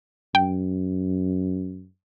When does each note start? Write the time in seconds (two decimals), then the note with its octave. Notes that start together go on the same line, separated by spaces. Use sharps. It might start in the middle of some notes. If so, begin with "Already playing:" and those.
0.35 F#2 G5